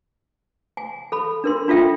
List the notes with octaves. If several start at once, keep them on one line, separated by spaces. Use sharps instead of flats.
G#5
A4 B5
D4 A#4 C6
D4 F4 A4 E5 G5